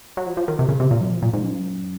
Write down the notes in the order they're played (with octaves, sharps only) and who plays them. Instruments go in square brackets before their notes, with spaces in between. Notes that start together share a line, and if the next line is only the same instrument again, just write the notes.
[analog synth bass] F#3
F3
F3
D#3
C3
C#3
C3
A#2
F#3
F3
A#2
G#2
F#2